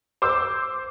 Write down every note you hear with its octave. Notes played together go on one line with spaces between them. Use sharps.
C5 D6 E6